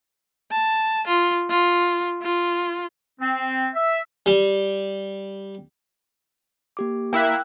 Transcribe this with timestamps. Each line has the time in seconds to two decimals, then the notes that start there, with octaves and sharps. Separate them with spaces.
0.51 A5
1.07 F4
1.50 F4
2.22 F4
3.20 C4
3.74 E5
4.26 G3
6.77 A#3 G4 D6
7.13 A#3 E4 E5 G5 E6 F#6